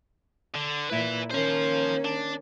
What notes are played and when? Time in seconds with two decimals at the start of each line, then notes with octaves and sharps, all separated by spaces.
0.55 D3
0.90 A#2 E4 B4 E5
1.31 D#3 A#3 C#4 C5 F5
2.05 D4